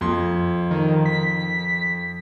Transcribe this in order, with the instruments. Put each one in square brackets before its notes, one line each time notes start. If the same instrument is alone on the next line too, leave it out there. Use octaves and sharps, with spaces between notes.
[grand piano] F2 C6
[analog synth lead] D#3
B6